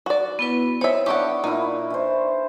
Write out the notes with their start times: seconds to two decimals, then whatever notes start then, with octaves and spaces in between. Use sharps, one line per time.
0.06 F#4 D5
0.39 B3 E4 B4
0.81 C4 C#5 E5
1.06 B3 D4 E4 G4 D5 F#5 C#6
1.44 A#2 D#4 E4
1.90 E3 C5